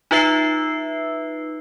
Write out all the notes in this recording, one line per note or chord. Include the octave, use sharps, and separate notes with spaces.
D#4 F4 B4 E5 E6 C7